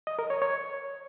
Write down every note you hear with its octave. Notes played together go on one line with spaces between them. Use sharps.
D#5
A#4
C#5
C#5